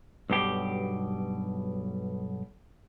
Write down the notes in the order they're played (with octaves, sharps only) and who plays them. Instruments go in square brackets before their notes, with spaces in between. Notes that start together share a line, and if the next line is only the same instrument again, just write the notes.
[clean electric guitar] B1 G2 B2 G4